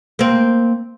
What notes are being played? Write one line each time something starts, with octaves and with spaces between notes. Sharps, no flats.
A#3 C4